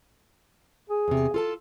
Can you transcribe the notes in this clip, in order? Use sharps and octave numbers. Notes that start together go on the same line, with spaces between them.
G#4
E2 C3
F4 A4 A5